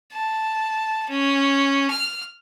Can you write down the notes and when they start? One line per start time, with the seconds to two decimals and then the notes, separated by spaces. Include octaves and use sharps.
0.13 A5
1.10 C#4
1.91 F6